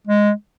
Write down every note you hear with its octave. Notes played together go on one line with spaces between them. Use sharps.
G#3